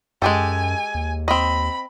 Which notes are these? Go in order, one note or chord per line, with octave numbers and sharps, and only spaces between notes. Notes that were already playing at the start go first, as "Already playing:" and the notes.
F#2 G#3 G4 A4 G#5
D#2
C4 D#5 B5